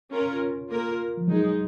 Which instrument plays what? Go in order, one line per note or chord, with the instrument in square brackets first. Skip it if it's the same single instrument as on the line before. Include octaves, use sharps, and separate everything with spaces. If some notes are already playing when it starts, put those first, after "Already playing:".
[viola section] C#4 F4 A#4
A#3 F4 A#4
[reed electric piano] F3
[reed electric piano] F#3 [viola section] G#3 D#4 G#4